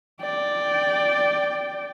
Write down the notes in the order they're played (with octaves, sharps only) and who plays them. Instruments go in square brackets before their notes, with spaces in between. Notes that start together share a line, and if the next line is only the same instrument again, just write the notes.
[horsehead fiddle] D5 G5